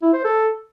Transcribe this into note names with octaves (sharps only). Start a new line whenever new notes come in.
E4
C5
A4